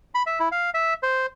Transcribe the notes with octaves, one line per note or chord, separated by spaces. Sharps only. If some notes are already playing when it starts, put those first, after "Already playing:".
B5
E5
E4
F5
E5
C5